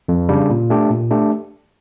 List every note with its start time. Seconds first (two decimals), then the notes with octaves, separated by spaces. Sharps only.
0.08 F2
0.29 C#3 G3 D4
0.50 A#2
0.70 A3 D4 G4
0.90 A#2
1.11 A3 D4 G4